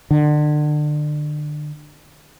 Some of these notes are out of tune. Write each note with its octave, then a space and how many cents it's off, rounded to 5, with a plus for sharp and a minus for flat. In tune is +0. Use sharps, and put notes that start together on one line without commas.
D3 +30